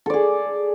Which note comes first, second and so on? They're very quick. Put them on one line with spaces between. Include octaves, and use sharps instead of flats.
A4 D5 G#4